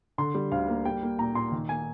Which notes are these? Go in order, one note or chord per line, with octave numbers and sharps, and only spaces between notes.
D3 C6
G3
D2 F5
A#3
G3 G5
A#3
A#2 A#5
A#2 C6
D#3
A#3 G#5